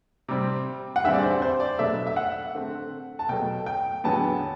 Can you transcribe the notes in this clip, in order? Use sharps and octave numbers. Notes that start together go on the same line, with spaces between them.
C3 G3 C4
F#5
E2 D3 G3 C4 E5
D5
C5
C5
D5
B2 F#3 A3 D4 E5
E5
F#5
D3 A3 C4
A5
B2 F#3 A3 G5
G5
E2 D3 F#3 B3 A5